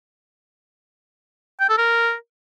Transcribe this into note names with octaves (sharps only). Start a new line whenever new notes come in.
G5
A4
A#4